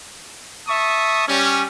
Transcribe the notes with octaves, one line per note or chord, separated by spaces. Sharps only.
E5 A5 C#6 D#6
G3 C#4